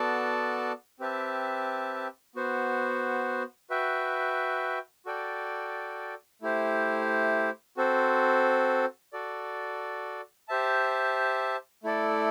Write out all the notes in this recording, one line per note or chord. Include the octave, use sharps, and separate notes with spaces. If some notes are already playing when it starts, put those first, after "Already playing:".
Already playing: B3 F#4 A4 D5 A5
C4 G4 B4 E5 A5
B3 F#4 C5
F#4 B4 E5 G5
F#4 A4 D5 G5
A3 E4 G4 C5
C4 F#4 A4 C5
F#4 A4 D5
G4 C5 E5 A5
A3 E4 A4 D5